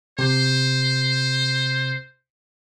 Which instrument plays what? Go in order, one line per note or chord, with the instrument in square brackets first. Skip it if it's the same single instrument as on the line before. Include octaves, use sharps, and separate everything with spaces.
[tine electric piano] C3 [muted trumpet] C5